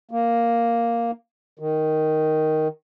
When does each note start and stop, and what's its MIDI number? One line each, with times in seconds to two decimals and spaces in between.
0.11 1.11 58
1.59 2.68 51